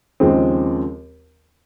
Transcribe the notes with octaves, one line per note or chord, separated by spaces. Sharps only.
D#2 C#3 F3 G#3 C4